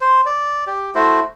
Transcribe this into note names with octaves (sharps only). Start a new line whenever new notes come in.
C5
D5
G4
A3 E4 F#4 C5